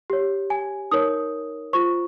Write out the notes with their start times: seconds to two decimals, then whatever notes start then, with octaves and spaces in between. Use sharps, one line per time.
0.10 G4 C#5
0.50 G#5
0.91 D#4 A#4 C#5 D#6
1.73 F4 C5 C#6